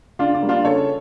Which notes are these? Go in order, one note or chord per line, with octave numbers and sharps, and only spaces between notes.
C#3 D4 F4
D4
G3 A#3
D4 F4
C#3 A4 C#5